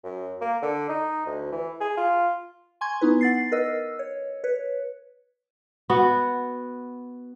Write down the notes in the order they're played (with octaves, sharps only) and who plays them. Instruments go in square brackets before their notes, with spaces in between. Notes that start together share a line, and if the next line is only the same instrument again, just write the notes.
[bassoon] F#2
A#3
D3
D#4
D2
E3
G#4
F4
[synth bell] G#5 C6 C#6 G#6
B3 D#4 E4 B4
F#5 A6 C7
A#4 B4 D#5 E6
C#5
B4 C#5
[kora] B3 F#4